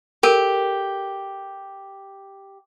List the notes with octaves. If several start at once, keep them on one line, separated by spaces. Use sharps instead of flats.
G4 A4 A#4